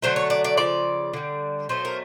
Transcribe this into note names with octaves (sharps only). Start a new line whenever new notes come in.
D3 F#3 A3 C5
C#5
D5
D5
C#3 F3 D5
D3 G3
B2 F#3 A3 C5
A#4